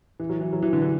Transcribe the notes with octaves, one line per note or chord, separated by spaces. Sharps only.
E3
F#3
E3
F#3
E3
D3
E3